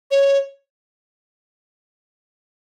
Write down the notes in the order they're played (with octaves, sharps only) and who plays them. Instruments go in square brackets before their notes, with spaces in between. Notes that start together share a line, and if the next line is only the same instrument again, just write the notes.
[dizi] C#5